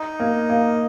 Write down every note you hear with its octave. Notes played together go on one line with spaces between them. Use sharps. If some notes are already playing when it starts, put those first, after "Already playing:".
Already playing: D#4
A#3
A#3